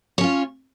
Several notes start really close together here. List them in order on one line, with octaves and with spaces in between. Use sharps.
C#5 C#4 F4